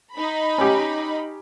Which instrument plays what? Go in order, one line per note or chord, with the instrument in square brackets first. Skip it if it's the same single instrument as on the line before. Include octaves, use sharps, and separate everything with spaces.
[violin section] D#4 B5
[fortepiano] C#4 G4